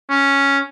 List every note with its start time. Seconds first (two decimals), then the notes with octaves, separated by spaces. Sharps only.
0.10 C#4